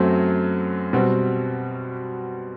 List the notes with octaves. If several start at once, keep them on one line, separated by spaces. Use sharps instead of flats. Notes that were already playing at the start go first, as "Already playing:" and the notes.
Already playing: F#2 F#3 A3 C4
B2 G3 C4 F#4